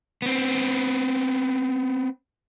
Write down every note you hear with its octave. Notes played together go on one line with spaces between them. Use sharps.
B3 C4